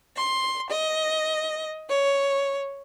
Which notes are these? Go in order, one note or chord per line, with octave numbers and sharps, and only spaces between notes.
C6
D#5
C#5